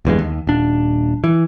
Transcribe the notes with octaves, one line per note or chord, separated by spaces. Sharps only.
F#1 E2 G2 G#3
D#2
D#1 D4
E3